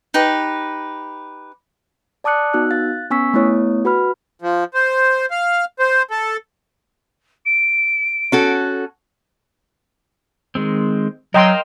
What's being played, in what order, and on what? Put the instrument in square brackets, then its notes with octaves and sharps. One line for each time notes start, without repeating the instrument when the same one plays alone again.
[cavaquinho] D#4 G4 B4
[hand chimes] D5 A5 D6 D#6 F#6 C#7
B3 D#4 F#4 E6 F#6
F5 F#6 A6
B3 C#4 G#5 C#6 E6 B6
A3 B3 E4 C#5 D#6
F#4 B4 B5 F6
[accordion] F3
C5
F5
C5
A4
[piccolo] D7
[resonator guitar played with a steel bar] C#4 F#4 A4
[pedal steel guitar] D#3 G#3 C4
[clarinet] F#3 [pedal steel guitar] A#4 C5 F5 [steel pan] D#5 G5 C6